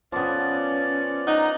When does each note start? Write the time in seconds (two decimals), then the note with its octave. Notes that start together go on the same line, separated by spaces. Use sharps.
0.12 F3 B3 C#4 D5
1.27 D#4 F#5 A#5